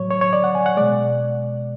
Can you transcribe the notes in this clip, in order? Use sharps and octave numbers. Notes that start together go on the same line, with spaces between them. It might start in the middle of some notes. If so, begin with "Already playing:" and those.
Already playing: A2 F#3 C#5
C#5
C#5
D5
F#5
G#5
F#5
B2 G#3 D5